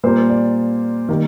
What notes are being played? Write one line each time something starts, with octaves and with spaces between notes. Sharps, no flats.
A#2 G3 A#3 C5
D5
D#3 G3 A#3